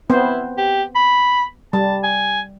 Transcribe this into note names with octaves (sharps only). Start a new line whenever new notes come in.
B3 C4 E4 C5
G4
B5
G3 A5
G#5